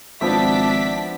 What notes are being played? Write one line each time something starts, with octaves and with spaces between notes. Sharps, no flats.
G#1 F3 B3 D4 E5 D6 B6